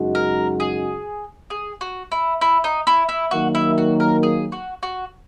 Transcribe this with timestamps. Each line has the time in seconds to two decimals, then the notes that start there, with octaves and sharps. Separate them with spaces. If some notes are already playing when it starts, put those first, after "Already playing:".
Already playing: F#2 C#3 G#3 D#4 F#4
0.15 A#4
0.60 G#4
1.50 G#4
1.81 F#4
2.12 E4
2.41 E4
2.64 D#4
2.87 E4
3.09 E4
3.31 D#3 F#3 A#3 F#4
3.55 E4
3.78 F#4
4.00 A#4
4.23 G#4
4.52 F#4
4.83 F#4